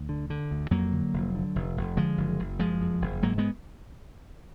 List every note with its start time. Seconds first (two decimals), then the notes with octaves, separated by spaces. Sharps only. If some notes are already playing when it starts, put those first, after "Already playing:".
Already playing: D2
0.09 D3
0.30 D3
0.51 D2
0.71 F2 F#3 A#3
0.92 D3
1.13 F1
1.35 D3
1.56 F1
1.77 F1
1.97 D3 F3 G#3
2.17 F#1
2.39 F#1
2.59 F#1 F3 G#3
2.81 F2
3.02 F#1
3.22 G#2 F#3 A#3
3.38 G#3 B3